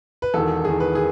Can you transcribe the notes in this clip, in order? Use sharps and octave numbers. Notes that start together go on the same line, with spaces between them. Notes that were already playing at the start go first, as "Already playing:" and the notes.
B4
E1 E2 D#3 A4
E1 E2 D#3 G#4
B4
D#3 G#4